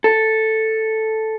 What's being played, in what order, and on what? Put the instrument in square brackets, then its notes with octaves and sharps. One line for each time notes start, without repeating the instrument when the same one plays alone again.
[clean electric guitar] A4